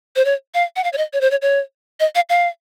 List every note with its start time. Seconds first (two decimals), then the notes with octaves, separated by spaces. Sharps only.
0.16 C5
0.25 C#5
0.54 F5
0.76 F#5
0.84 F5
0.93 C#5
0.98 D#5
1.13 C#5
1.21 C5
1.31 C#5
1.42 C#5
2.00 D#5
2.15 F5
2.30 F5